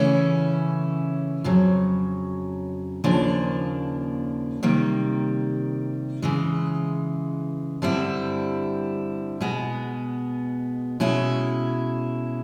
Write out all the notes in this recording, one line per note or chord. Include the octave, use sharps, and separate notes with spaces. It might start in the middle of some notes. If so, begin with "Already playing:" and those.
Already playing: C#3 E3 A3 C#4 E4
F2 C#3 F#3
D#2 C#3 F3 A#3 D4
C3 D#3 G3 A#3
C#3 E3 G#3
G2 D3 G3 C4 E4
B2 G#3 B3
B2 G#3 C#4 E4